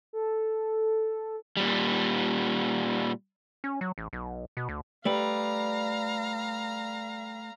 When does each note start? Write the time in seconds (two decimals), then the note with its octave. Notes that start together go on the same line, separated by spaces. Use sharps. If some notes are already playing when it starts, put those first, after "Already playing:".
0.13 A4
1.57 A#2 G3
3.64 C#4
3.81 F#3
3.98 A1
4.13 B1
4.57 B2
4.69 D2
5.05 G3 A3 B4 F5 A#5